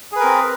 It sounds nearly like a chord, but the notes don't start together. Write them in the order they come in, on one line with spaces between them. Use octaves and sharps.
G#4 B4 A#4 C4